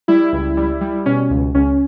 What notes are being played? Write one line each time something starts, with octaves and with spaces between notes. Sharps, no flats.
G3 E4
C#2
G3
G3
B2 C#4
C#2
C#2 C#4